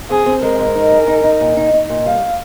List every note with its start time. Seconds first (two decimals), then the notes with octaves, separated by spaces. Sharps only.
0.10 C4 G#4
0.26 C4
0.42 G#3 A#4
0.59 G#2
0.75 D#4
0.92 G#4
1.08 D#4
1.24 D#4
1.41 A#2
1.57 D#4
1.73 D#4
1.90 A#2
2.06 G3 F5